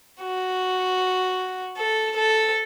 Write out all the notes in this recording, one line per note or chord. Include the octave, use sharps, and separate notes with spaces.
F#4
A4
A4